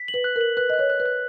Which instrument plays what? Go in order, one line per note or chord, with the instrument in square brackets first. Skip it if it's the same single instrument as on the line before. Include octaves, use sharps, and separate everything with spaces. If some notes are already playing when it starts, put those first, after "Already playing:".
Already playing: [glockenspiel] B6
F#7
[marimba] B4
[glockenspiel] F#6
[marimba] A#4
[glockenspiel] F#7
[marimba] B4 [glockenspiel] F#6
[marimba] D#5
[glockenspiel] F#6
[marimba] C#5
[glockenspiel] F#6
[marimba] B4
[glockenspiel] F#6